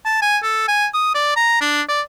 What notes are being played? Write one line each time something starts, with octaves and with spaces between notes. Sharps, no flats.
A5
G#5
A4
G#5
D#6
D5
A#5
D4
D5